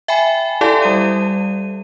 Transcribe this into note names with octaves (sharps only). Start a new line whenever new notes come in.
E5 G5 G#5 B5
E4 G4 A4 D5 F5 A5
G3 D#7